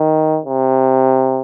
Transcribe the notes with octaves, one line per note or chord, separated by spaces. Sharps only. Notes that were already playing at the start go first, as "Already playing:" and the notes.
Already playing: D#3
C3